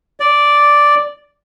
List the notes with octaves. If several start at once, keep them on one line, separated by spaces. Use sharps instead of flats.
D5